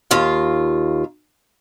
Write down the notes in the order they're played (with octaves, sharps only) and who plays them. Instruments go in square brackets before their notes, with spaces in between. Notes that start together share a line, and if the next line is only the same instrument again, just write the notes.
[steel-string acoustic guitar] D#2 F4 F5